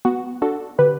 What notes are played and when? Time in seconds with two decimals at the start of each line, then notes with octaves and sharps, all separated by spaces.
0.05 B3 F#4
0.42 D4 F#4 A4
0.78 D3 G4 B4